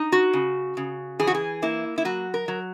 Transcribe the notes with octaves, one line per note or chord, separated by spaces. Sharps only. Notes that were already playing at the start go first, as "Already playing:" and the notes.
Already playing: D#4
F#4
C#3
C#3
E3 G#4
F#4
G#4
A#3 E4
E4
F#3 F#4
A#4
F#3